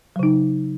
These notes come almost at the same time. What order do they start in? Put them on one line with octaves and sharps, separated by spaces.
F#3 C#3 D#4